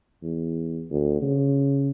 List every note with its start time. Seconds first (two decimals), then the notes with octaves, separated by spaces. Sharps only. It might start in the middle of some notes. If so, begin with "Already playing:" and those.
0.23 E2
0.91 D2
1.22 C#3